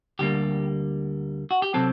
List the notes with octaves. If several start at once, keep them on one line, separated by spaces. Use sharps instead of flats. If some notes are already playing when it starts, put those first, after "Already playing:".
D2 D3 G3 A#3 G4
F#4
G4
C3 F#3 C4 A4